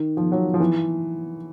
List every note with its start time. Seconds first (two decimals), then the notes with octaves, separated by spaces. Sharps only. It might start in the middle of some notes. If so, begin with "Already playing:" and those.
Already playing: D#3
0.17 F3
0.32 F#3
0.54 F3
0.60 E3